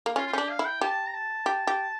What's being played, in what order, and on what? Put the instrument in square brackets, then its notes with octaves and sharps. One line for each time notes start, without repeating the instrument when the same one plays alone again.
[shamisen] A#3
[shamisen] C#4 [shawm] F4
[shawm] F4
[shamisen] C#4 [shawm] G4
[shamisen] D4
[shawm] F5
[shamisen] E4
[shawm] G5
[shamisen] G4 [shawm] A5
[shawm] A#5
A5
[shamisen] G4
G4